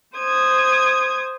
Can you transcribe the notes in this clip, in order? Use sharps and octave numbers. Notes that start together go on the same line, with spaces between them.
C5 D#6 G#6